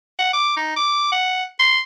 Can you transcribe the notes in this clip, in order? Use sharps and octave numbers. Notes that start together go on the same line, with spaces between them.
F#5
D6
D#4
D6
F#5
C6